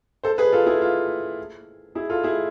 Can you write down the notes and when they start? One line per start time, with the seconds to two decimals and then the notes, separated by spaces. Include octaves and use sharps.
0.24 A4 C5
0.38 G#4 B4
0.53 F4 A4
0.66 E4 G#4
0.81 F4
1.95 E4 G#4
2.09 F4 A4
2.23 E4 G#4